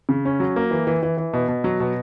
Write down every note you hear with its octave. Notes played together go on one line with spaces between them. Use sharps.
C#3
C#4
F#3
A#3
E3
E3
E3
E3
B2
B2
F#3
B2